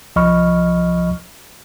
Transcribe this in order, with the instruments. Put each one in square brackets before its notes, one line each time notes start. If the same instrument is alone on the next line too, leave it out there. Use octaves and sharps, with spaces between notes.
[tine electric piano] C2 F3 D#5 B5 C#6 F6